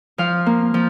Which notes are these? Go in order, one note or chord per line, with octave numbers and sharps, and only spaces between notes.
F3 F5
A#3
F3